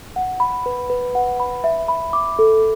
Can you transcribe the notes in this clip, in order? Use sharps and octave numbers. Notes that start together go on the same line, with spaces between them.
F#5
B5
B4
B4
F#5
B5
E5
B5
D6
A4